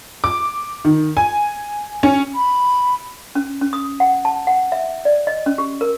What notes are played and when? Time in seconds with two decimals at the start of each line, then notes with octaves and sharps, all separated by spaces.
0.24 D6
0.85 D#3
1.17 G#5
2.03 C#4
2.35 B5
3.35 C#4
3.61 C#4
3.73 D#6
4.00 F#5
4.25 A5
4.47 F#5
4.72 E5
5.05 D5
5.27 D#5
5.46 C#4
5.58 G4
5.81 A#4